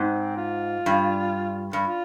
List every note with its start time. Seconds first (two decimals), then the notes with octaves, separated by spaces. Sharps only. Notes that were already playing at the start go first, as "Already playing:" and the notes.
Already playing: G#2 C4
0.37 F4
0.86 G2
1.73 G2
1.84 F4